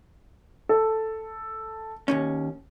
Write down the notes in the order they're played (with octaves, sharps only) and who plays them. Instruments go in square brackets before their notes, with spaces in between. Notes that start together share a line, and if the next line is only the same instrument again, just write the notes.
[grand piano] A4
[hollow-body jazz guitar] D#2 G#2 C#4